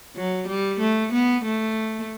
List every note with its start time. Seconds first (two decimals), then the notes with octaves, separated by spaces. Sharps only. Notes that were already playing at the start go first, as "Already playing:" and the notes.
0.16 F#3
0.47 G3
0.80 A3
1.12 B3
1.45 A3